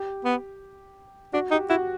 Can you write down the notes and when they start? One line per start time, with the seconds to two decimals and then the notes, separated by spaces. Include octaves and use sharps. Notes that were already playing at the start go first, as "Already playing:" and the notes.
Already playing: G4
0.25 B3
1.33 D4 F#4
1.51 D#4 G4
1.70 E4 F#4